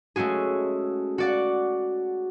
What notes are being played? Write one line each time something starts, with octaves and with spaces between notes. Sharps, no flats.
G#3 A3 C#4 F#4 G#4
F#4 D5 F#5